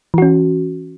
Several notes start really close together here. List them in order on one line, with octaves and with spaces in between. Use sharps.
E3 F#4 C#4